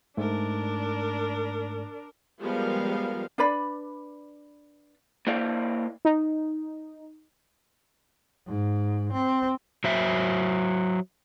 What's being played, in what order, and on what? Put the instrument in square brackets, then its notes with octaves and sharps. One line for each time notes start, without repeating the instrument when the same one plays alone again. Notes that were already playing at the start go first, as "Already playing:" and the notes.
[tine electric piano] G#2 A3 [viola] D4 A#4
[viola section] F3 G3 G#3 B3 A#4 F5
[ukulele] D4 B4 D5 B5
[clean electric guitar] A#3 E4 C5 D5 F5
[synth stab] D#4
[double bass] G#2
C4
[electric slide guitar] F#3 C5 E5